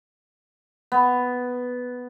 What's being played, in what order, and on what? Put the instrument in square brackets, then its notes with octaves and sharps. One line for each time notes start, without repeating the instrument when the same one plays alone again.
[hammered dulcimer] B3